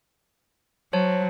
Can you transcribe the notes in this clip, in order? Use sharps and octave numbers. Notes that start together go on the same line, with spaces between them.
F#3 C5 C#5 A5